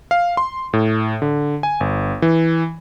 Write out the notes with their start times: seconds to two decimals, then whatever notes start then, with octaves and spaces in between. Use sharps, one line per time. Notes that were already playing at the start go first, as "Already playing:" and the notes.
0.11 F5
0.37 C6
0.73 A2
1.22 D3
1.63 G#5
1.80 G1
2.22 E3